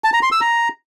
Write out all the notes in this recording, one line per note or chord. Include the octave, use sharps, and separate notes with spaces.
A5
A#5
C6
E6
A#5